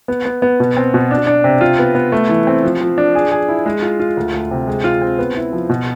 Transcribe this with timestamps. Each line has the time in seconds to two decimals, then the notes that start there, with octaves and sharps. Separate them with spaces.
0.08 B3
0.26 B3
0.42 B3
0.60 B2
0.77 C4
0.94 B2
1.11 D4
1.27 D4
1.44 C3
1.61 F4
1.79 B3
1.95 B3
2.12 A3
2.29 E3
2.47 C4
2.64 F3
2.81 F3
2.98 D4
3.15 G#4
3.31 G#4
3.48 E4
3.66 G#3
3.82 F4
4.00 F4
4.17 D2
4.33 D2
4.51 C3
4.67 G#3
4.84 F4
5.02 C4
5.19 B3
5.36 E4
5.53 F3
5.69 B2